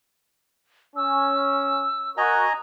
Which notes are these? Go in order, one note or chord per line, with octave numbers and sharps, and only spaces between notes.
C#4 E6
F#4 A#4 D#5 G#5 A#5